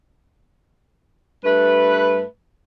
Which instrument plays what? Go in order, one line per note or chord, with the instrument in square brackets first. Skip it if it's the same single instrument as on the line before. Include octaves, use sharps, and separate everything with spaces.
[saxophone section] G2 A3 B4